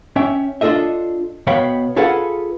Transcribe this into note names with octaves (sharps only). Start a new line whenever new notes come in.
C#4 E5 G5
D4 F4 A4 D#5 E5
B2 B3 C#5 F5 G5 B5
F4 G#4 A4 B4 F5 F#5